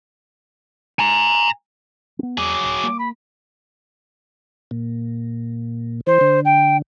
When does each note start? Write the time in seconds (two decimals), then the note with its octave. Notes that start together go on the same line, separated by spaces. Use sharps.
0.99 G#5 A#5
2.19 B3 C4
2.38 E2 F#3 G#4 D6
2.64 D#1
2.83 A#3
2.99 B5
4.71 A#2
6.07 E3 C5
6.21 D3
6.45 G5